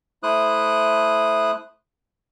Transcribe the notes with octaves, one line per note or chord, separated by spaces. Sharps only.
A3 E4 C5 D#6 F#6